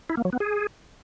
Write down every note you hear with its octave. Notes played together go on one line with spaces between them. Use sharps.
E4
A#3
F#3
B3
G#4